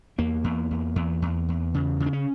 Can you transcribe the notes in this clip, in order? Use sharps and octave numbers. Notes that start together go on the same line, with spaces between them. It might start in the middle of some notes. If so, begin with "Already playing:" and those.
E2 A#3
E2
E2
E2
E2
E2
C#3
C#3
D4
C#4